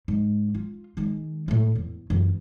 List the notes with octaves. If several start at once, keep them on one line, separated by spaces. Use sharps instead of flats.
G#2
F4
D#3 G#3
A2 A3
E2
F#2 E3